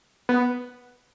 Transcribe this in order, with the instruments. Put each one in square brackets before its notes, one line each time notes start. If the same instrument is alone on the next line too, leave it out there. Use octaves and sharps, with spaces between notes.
[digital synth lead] B3